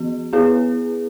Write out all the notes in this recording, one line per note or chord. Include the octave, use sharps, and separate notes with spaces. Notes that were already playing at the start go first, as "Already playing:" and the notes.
Already playing: E3 B3 F#4
B3 E4 G#4 B4